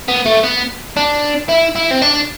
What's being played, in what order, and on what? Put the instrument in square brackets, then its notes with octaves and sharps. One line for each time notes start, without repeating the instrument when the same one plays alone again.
[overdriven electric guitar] B3
A3
B3
D4
E4
E4
C4
D4